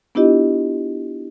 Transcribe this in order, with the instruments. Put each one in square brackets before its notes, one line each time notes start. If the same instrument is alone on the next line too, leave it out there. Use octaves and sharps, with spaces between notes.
[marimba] B3 D4 E4 F4 G4 D#5